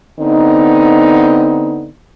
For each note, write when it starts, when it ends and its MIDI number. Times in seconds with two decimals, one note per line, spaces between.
0.19 1.89 50
0.19 1.89 59
0.19 1.89 60
0.19 1.89 63